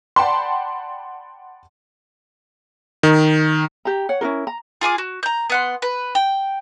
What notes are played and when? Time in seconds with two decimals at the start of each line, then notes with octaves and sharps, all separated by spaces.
0.16 D5 F#5 G5 A5 B5 C6
3.03 D#3
3.85 G4 A#5
4.09 C#5 F#5
4.21 C#4 E4 F4 A#4
4.47 A#5
4.81 F4 G#4 G#5 D6
4.98 F#4
5.23 A#5 G6
5.50 B3 F#5 C6
5.82 B4
6.15 G5